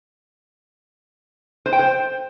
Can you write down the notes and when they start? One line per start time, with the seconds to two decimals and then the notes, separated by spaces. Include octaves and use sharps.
1.66 C5
1.73 G5
1.79 C5